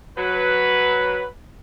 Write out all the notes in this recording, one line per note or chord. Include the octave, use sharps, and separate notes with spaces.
F#3 B4